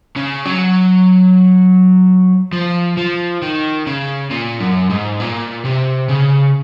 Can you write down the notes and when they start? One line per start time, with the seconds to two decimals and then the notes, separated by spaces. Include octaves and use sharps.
0.16 C#3
0.45 F#3
2.53 F3
2.97 F3
3.42 D#3
3.86 C#3
4.31 A#2
4.60 F#2
4.90 G#2
5.20 A#2
5.65 C3
6.09 C#3